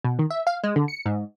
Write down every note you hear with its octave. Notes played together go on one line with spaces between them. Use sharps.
B2
D#3
E5
F5
G#3
D3
C#7
G#2